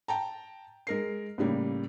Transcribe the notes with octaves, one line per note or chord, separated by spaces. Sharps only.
G5 A5 A#5
G#3 A#4 C7
A2 C#3 G3 A#3